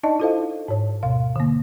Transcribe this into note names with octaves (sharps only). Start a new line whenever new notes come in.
D4 D#4 D5 D#5 A5
E4 F4 A4 C5 D#5 F5
G#2 C#5
D2 B2 F5
D3 A#3